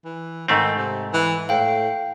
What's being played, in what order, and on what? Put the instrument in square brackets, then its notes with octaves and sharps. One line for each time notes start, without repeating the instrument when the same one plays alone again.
[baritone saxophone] E3
[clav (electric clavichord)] G#2 A3 C4 [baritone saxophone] D#3
[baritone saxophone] C3
E3
[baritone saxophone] A2 [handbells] F5 G5